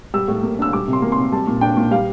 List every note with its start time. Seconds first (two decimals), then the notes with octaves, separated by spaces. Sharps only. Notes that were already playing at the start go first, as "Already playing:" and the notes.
0.14 G3 E6
0.28 A2
0.43 A#3
0.59 D4 E6
0.73 G3 D6
0.88 C3
0.93 C6
1.02 A#3
1.12 C6
1.18 C3
1.32 G3 A5
1.47 A#2
1.61 D4 G5
1.77 A#2
1.91 G3 F5